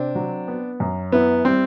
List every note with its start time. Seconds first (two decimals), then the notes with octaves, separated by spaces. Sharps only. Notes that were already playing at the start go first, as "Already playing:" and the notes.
Already playing: C3 C4 D4
0.15 F#3
0.48 B3
0.80 F#2
1.12 B3 E4
1.45 G3 C4